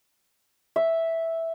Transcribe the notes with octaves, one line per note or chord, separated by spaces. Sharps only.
E5